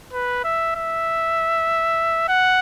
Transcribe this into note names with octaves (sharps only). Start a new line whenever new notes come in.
B4
E5
E5
F#5